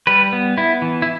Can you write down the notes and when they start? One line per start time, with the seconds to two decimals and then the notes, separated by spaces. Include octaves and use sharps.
0.07 G3 B4
0.33 B3
0.57 B3 E4
0.82 E3
1.02 E4